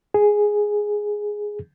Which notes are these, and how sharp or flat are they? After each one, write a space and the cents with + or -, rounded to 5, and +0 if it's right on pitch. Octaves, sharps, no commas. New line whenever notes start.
G#4 +0